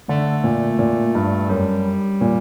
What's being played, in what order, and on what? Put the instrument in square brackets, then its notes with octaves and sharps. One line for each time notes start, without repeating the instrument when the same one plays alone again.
[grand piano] D3 [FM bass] A3
[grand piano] A#2
A#2
G2
[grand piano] F#2 [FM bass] G3
[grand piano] A#2